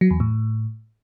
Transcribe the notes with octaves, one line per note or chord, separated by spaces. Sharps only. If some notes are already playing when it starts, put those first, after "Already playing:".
F#3
E2
A2